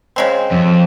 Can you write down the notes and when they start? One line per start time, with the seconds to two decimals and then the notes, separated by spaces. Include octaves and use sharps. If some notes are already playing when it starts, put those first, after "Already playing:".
0.16 C#3 G#3 C4
0.52 F2